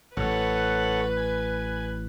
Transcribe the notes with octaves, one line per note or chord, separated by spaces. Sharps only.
A1 A4 B4 C#5 F#5
G#5